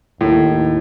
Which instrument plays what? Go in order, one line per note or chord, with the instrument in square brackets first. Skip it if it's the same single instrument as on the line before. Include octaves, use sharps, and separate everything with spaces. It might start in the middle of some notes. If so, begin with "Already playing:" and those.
[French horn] D#2 [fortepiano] A2